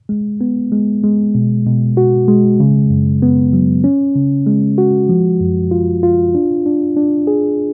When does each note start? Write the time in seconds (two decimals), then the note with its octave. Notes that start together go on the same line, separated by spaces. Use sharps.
0.09 G#3
0.41 B3
0.72 G#3
1.04 G#3
1.35 B2
1.66 B2
1.97 F#4
2.28 G#3
2.60 C#3
2.90 F#2
3.22 B3
3.53 F#3
3.84 C#4
4.15 C#3
4.47 G#3
4.78 F#4
5.09 F3
5.40 F#2
5.71 F4
6.03 F4
6.35 D4
6.66 D4
6.97 D4
7.27 G#4